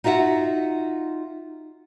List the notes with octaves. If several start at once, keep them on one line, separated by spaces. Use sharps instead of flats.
D#4 F4 F#4 E5 F#5